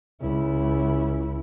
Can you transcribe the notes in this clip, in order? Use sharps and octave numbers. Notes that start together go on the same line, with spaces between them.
C#2 E4